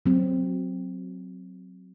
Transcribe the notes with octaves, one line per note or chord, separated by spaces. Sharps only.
F#3 C4